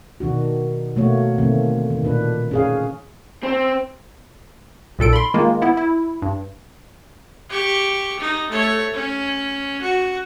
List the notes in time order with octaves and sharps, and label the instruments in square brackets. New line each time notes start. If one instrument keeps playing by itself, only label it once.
[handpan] B2 D#3 D4 F#4
B2 A3 A#3 F#4 C#5
B2 D3 D#3 A3 A#3 C4
D#3
A#2 D4 B4
C#4 G#4 F5
[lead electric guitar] C4
[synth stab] B1 A#2 A4 D7
B5 C6
D#3 G#3 A#3 F4
B3 E4
E4
G2
[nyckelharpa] G4 C#6
D#4
A3 C#5
C#4
F#4